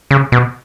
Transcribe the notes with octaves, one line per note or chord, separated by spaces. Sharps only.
C#3
B2